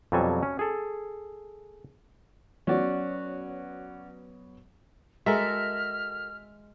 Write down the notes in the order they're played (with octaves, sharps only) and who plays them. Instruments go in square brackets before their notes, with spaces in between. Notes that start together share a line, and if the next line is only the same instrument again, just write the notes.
[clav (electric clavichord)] F2 B2 F#3 G3 A4 G#5
C#4
G#4 A4
[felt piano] F#3 B3 [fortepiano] C#4 F#4 D5
[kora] G#3 [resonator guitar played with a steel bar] F#4 A4 A#4 [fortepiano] E5 [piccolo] F6